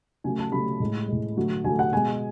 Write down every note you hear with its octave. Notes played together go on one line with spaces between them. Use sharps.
C#3 F#3 A3 G#5
A5
C#3 F#3 A3 B5
A2 G#3
A2 G#3
D3 F#3 A3
D3 F#3 A3 G#5
F#5
B2 G#3 G#5